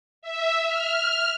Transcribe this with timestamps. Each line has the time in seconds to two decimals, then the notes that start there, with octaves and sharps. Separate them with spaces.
0.22 E5
0.66 F6